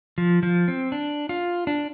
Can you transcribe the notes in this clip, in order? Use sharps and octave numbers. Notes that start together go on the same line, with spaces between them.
F3
F3
C4
D4
F4
D4